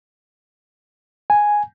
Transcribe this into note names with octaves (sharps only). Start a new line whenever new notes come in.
G#5